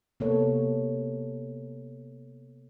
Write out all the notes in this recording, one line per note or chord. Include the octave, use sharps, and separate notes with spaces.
C3 A#3 B3 A4 C#5